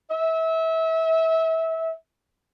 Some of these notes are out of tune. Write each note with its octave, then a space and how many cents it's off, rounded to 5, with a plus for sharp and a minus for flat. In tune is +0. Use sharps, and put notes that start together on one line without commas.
E5 -25